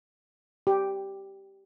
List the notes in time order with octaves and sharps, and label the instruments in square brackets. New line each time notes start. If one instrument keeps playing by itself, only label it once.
[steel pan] G4